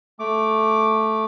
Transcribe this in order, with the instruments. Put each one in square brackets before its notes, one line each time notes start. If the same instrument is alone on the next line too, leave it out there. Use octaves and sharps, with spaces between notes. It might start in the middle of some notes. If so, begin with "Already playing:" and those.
[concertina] A3 D6